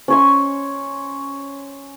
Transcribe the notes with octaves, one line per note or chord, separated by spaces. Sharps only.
C#4 C#5 C6